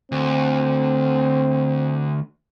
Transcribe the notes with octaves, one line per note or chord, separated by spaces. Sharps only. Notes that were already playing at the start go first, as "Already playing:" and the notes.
D2 C4